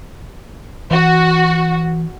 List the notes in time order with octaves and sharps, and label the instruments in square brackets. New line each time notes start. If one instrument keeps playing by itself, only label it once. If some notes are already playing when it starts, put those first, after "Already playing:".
[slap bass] E3 [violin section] F#4